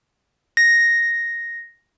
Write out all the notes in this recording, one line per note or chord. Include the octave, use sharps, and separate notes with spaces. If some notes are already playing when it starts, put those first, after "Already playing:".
A#6